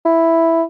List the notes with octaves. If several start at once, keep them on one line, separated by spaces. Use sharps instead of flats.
E4